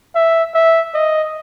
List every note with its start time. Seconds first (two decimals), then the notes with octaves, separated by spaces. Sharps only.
0.15 E5
0.55 E5
0.94 D#5